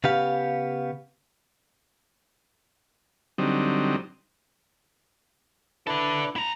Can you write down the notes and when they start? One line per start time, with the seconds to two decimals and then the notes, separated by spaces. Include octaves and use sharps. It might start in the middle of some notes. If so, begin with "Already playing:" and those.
0.04 C#3 B3 G4 F5
3.38 D3 F#3 G3 C4 D#4
5.87 D4 E4 A4 B4 D5
6.36 E4 A#5